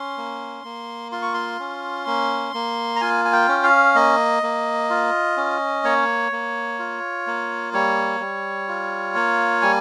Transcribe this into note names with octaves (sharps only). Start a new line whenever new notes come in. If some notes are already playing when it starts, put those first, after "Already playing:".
Already playing: C#4 C6
A#3
A#3
F4 C6
C#6
C6
C#4
A#3
A#3
A#5
F4 G#5
G#5
G5
C#4
F5
A#3 D#5
A#3
F4
C#4
A#3 C#5
A#3
F4
A#3
G3 C#5
G3
F4
A#3
G3 G#5